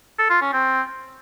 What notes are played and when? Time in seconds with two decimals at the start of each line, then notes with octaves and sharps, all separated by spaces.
0.19 A4
0.30 F4
0.41 C#4
0.53 C4